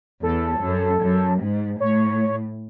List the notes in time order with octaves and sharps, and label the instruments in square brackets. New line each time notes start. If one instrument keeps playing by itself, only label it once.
[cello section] E2 [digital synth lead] A4
[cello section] F#2
F#2
G#2
[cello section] A2 [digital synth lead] C#5